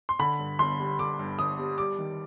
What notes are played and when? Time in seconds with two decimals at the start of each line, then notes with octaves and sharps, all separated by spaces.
0.09 C6
0.19 D3 B5
0.39 G2
0.59 G1 C6
0.79 G3
0.99 D3 D6
1.19 G2
1.38 G1 D#6
1.59 G3
1.78 G3 D6
1.99 D#3